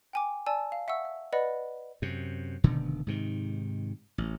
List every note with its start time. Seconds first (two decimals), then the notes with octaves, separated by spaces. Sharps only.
0.13 G5 G#5 D6
0.46 D5 G#5 A5 E6
0.72 F5
0.88 E5 F#5 C#6 E6
1.05 E5
1.33 B4 D5 D#5 F#5 B5
2.02 F#2 C3
2.64 F1 B2 D3 D#3
3.07 G#2 C3 D#3
4.18 A1